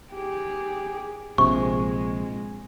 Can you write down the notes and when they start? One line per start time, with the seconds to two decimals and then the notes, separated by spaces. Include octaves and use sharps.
0.12 G4 G#4
1.38 A#1 C3 G#3 C#6